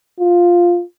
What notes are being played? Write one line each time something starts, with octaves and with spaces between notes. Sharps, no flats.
F4